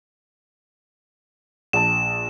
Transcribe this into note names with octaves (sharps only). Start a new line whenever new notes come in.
A#1 A5 E7